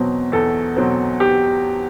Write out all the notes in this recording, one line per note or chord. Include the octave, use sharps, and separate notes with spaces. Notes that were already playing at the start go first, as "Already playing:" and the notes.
Already playing: E2 B2 F#3 C4
E2 A4
B2 F#3 C4
G4